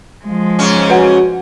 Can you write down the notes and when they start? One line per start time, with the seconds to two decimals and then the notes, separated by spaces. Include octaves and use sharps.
0.25 F3 G#3
0.59 G#2 C#3 C#4
0.90 F#4 B4 F#5